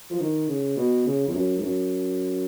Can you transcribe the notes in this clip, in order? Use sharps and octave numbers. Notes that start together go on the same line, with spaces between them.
F3
D#3
C#3
B2
C#3
F2
F#2
G#2
F#2